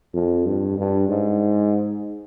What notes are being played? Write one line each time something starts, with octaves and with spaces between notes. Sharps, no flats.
F2
G2
G2
G#2